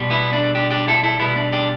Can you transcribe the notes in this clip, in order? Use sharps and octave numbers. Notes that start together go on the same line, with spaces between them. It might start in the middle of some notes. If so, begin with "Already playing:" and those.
Already playing: B2 G3
B3 E4
D4
D4 G4
D4 G4
E4 A4
E4 A4
B2 G3 B3 E4
D4
D4 G4